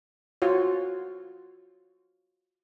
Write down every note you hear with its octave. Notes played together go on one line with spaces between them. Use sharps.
F4 F#4 C#5